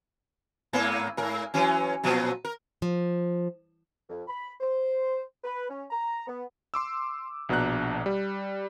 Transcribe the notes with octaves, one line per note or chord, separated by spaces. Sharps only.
G#2 A#3 B3
G#2 A#4
E3 F#3 C#4
A#2 F3 F#3
A#4
F3
F2
B5
C5
B4
C#4
A#5
B3
C6 D6 E6
A#1 B2 D4 A#5 F#6
G3